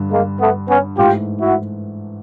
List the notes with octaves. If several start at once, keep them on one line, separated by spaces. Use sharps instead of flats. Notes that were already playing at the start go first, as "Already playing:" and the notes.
Already playing: G2 D3 G3
G#3 A#3
A3 B3
B3 C#4
G#2 E3 A3 F4 G4
E4 F#4